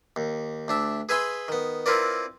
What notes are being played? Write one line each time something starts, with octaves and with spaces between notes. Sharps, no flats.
D#2
D2 D4 E5
G#4 B4 E5 G#5 B5 C6
D#3 B3
C4 E4 F4 A#4 B4 D5